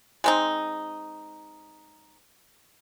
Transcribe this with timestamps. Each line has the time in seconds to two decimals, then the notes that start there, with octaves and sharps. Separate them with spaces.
0.24 G#3 C4 D#4